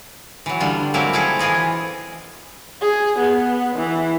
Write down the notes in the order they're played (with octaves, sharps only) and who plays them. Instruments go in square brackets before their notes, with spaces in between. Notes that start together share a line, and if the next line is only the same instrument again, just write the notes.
[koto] E3 F#3
D3 G3 F4
F#3 G#3 A#3 C4 E4 A#4
E4 F4 G#4 A4
E3 F4 G#4 D#5
[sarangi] G#4
B3
E3